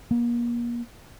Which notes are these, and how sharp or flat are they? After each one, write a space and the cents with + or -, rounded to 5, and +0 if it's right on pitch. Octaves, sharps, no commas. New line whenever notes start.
A#3 +35